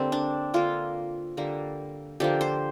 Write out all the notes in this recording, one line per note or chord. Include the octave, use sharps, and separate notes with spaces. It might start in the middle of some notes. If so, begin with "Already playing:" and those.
Already playing: D3 G3 A#3 C4
D4
D3 A#3 F4
D3 G3 A#3
D3 F3 A#3 G4
C5